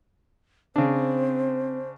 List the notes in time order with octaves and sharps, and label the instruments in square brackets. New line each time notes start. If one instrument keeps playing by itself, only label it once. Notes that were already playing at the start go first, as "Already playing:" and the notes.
[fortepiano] C#3 D4 [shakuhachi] C4 [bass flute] C5